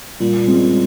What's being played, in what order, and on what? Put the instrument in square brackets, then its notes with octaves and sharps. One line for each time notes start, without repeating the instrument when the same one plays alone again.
[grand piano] A#2 [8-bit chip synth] G3
[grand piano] G#3 C4